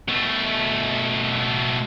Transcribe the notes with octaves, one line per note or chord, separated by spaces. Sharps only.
B2 A3